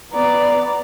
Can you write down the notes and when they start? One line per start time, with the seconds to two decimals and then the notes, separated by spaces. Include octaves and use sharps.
0.12 B3 D5 A#5